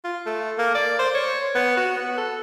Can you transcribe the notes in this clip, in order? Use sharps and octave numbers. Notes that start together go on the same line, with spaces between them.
F4
A3
A#3
D5
C5
C#5
B3
F#4
B3
A4